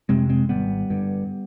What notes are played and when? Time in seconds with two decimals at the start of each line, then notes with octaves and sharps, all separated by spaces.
0.09 F2 C3 G#3 C4
0.29 G#3 C4
0.49 G#1 G3 B3
0.90 G2 D3